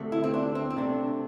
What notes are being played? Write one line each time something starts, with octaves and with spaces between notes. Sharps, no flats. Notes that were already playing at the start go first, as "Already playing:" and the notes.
Already playing: D2 C3 A3
E4
C4
D4
C4
C4
C3 A3 D4